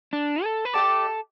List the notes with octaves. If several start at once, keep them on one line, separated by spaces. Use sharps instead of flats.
D4
A4
B4
A3 G4 A4 D5